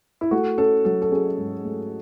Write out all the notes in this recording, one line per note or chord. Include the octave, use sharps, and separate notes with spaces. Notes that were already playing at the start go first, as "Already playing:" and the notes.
E4
A3 F#4
C#4 A4
F#3 A4
A4
C#4 G#4
G#2
A3